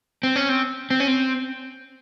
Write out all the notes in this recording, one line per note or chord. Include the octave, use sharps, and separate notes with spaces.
C4
C#4
C4
C4
C#4
C4